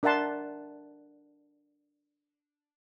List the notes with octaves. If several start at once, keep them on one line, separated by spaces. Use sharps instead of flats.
D4 A#4 E5 F#5 A5 C6